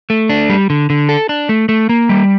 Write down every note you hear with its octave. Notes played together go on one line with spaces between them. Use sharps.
A3
D4
G3
D3
D3
A4
D4
A3
A3
A#3
G3